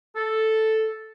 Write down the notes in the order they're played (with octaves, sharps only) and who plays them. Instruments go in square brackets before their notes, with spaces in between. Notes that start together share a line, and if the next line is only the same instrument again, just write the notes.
[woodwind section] A4